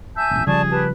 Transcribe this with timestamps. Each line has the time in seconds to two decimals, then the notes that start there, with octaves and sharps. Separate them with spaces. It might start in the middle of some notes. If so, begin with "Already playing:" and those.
0.17 E5 G#5 A5 G6
0.31 E1 A1
0.47 C#3 F3 G3 G#4 D5 A5 C#6
0.71 G4 B4 A5